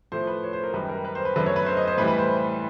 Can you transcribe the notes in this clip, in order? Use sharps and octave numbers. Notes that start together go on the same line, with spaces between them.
A2 F3 A3 C5
B4
C#5
C5
A#4
F#2 D#3 G3 B4
A#4
B4
C5
B4
F#2 D3 F#3 A3 B4
C#5
B4
C5
D#5
C5
A2 E3 G3 B4
B4
C5